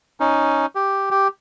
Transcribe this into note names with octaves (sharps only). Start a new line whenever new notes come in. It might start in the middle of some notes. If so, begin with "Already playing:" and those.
C#4 D#4
G4
G4